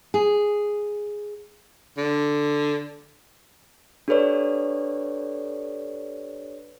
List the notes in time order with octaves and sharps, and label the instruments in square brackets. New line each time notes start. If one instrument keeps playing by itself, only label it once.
[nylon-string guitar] G#4
[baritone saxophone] D3
[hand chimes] D4 G4 A4 B4 C#5 D5